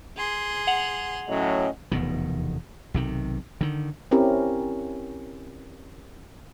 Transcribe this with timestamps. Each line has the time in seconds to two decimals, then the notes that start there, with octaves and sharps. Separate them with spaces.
0.16 G#4 C6
0.67 F#5 F7 F#7
1.29 A2 F#3 C#4 D#5
1.92 F1 E2 B2 D#3
2.94 B1 C3 D#3
3.61 D3 D#3
4.11 C4 C#4 E4 G4 A#4